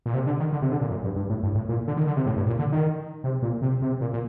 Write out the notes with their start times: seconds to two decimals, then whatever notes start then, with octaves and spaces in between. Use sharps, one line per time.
0.06 A#2
0.14 C3
0.26 D3
0.40 D#3
0.52 D3
0.62 C3
0.72 D3
0.81 A#2
0.91 F#2
1.04 G2
1.16 G2
1.30 A2
1.43 G2
1.55 A2
1.69 A#2
1.88 D3
1.97 D#3
2.07 D3
2.17 C3
2.26 A2
2.36 G2
2.47 A#2
2.59 D3
2.72 D#3
3.24 C3
3.42 A#2
3.62 C3
3.82 C3
4.01 A#2
4.13 A#2